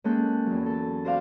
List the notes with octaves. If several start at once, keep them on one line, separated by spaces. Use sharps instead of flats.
G#3 A#3 C#4 A4 G5 F#6
E2 F#3
A4 A5
F#4 C5 D5 F5